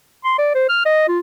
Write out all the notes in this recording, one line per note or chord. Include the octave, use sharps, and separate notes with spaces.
C6
D5
C5
F6
D#5
F4